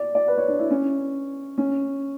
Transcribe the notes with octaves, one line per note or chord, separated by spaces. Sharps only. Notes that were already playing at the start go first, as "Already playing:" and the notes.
Already playing: D5
D5
B4
C#5
D4
E4
C#4
C#4